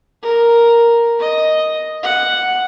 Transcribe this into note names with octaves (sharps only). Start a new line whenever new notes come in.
A#4
D#5
F#5